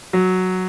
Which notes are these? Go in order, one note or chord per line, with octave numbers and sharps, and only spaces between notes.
F#3